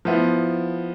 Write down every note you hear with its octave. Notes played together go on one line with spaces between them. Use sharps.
F3 B3 E4